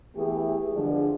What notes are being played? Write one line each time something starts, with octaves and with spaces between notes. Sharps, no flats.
E3 A3 B3 G4 G#4
G2 D3 F3 G#3